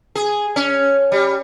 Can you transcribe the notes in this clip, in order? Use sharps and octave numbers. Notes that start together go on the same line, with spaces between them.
G#4
C#4
G3